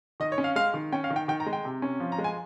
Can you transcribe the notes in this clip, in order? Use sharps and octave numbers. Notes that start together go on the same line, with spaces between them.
D#3 D#5
C#5
C#4
F5
G#3 F5
D#3
C#4 G5
F5
D#3
G5
D#3 G5
A#5
G#3
G5
C3
C#4
F3
A#5
G#3
G#5